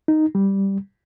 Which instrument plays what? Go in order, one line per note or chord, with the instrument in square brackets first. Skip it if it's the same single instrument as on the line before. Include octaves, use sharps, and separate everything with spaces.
[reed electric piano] D#4
G3